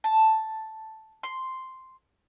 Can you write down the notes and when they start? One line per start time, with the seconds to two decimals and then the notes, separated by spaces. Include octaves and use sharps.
0.04 A5
1.23 C6